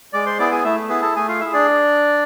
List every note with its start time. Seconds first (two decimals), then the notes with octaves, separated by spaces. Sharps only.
0.13 G#3 D5 D6
0.26 C5 C6
0.39 B3 E4 G#4 D5 D6
0.52 G#4 G#5
0.64 A3 E4 E5
0.89 B3 E4 G#4 B4
1.02 A4 A5
1.16 A3 G#4 G#5
1.28 F4 F5
1.40 E4 G#4 E5
1.53 D4 D5